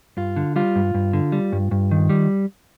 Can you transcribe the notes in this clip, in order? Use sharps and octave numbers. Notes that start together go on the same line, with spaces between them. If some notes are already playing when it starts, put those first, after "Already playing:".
G2 F4
D3
G3 F4
G2
G2
D3
G3
G2
G2
D#3
G3